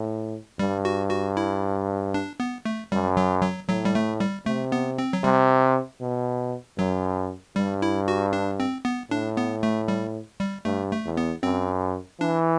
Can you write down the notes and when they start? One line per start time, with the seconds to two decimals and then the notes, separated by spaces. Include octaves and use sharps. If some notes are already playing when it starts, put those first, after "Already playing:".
Already playing: A2
0.59 G2 G3
0.85 F#4
1.10 F#4
1.37 E4
2.14 D4
2.40 B3
2.65 A3
2.92 F#2 G3
3.17 F#3
3.43 F#3
3.69 A2 F#3
3.85 G3
3.95 A3
4.20 G3
4.46 C3 A3
4.72 B3
4.98 C4
5.13 F#3
5.24 C3 G3
6.01 B2
6.78 F#2 F#3
7.56 G2 G3
7.82 E4
8.08 F#4
8.33 D4
8.60 C4
8.85 B3
9.10 A2 D4
9.37 B3
9.63 A3
9.88 G3
10.40 G3
10.65 G2 A3
10.91 A3
11.05 E2
11.17 B3
11.43 F#2 C4
12.20 E3 D4